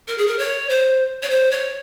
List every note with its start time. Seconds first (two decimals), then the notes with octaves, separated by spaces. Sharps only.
0.08 A#4
0.18 G#4
0.27 A#4
0.39 C#5
0.70 C5
1.22 C#5
1.30 C5
1.51 C#5